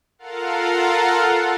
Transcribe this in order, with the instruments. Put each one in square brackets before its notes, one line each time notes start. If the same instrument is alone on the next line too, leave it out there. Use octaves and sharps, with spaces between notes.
[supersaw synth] F4 A4 A#4 F5 F#5